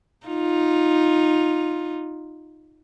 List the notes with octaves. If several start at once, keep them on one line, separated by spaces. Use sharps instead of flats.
D#4 F4